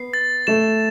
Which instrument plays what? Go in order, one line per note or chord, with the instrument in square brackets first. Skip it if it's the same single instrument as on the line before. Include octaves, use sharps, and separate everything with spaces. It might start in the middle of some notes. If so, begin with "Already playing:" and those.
Already playing: [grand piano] B3 [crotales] C7
[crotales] A6
[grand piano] A3 [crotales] E7